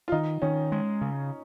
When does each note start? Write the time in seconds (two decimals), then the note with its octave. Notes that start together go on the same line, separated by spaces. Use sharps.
0.08 F4
0.12 D#3 D#4
0.42 D#3 C#4
0.72 G#3
1.02 C#3